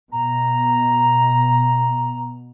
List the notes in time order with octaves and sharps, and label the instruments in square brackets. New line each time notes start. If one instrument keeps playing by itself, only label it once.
[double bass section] B2 [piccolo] A#5